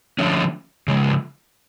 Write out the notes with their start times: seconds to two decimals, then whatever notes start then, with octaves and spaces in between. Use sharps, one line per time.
0.19 D3 F3 A3 C#4
0.88 C#3 F3 G#3